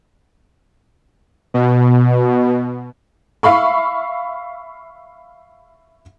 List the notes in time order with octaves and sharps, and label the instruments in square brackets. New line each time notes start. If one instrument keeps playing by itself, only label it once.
[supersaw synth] B2
[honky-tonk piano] E5 F5 B5 C#6